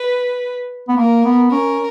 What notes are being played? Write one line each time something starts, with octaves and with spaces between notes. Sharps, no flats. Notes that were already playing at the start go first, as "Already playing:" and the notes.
Already playing: B4
B3
A#3 A#4
B3
C#4 A#4